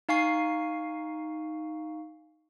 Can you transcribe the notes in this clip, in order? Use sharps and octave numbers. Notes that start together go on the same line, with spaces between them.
D#4 F5 G#5 C#6 C7